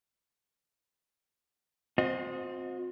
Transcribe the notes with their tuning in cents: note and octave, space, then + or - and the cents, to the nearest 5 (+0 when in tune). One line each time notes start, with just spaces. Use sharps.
C4 +0 F#4 -45 D#5 +0